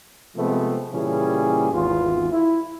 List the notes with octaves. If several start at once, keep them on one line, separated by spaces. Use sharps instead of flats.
C3 F3 G#3 A3 B3 C4
A#2 C#3 E3 G3 C#4 G#4
G#1 E2 F4
E4